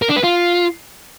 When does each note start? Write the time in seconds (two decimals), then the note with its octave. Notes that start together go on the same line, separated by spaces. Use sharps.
0.02 A#4
0.09 D4
0.16 B4
0.23 F4